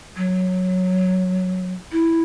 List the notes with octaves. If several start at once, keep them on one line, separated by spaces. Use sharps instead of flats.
F#3
E4